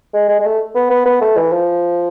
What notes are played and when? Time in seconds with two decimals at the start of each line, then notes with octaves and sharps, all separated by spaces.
0.14 G#3
0.29 G#3
0.40 G#3
0.45 A3
0.75 B3
0.90 B3
1.06 B3
1.21 A3
1.37 E3
1.52 F3